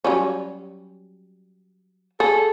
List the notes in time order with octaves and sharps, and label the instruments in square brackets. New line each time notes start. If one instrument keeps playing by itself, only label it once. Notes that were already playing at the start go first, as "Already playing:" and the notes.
[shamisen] F#3 G3 C#4
[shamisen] G#4 [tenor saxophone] A4